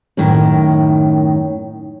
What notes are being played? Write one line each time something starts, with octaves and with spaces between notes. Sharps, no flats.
F#2 A2 D#3